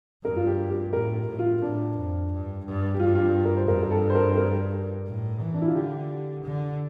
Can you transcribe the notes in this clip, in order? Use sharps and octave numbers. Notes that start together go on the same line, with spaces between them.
G2 A#4
F4
G4
G4
A2 A#4
A2
F4
A2 D4
F2
G2
G2
G4
G2 F4
F4
G4
A#4
C5
G2 A#4
A#4
A4
C5
A#4
C5
A#4
A2
E3
D4
E4
F4
D3 G4
D3